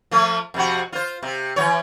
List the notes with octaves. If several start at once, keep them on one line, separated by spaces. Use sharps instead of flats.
F3 A3
F2 C3 F#4
F4 C5
C3
E3 F#3 C#5